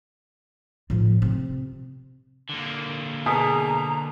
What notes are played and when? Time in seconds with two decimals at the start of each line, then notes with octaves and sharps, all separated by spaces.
0.90 A2 F3
1.22 C3
2.49 D3 A#3
3.26 B2 G#4 A#5